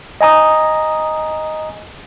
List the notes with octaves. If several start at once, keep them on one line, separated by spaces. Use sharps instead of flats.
D#5 G#5 A#5 D#6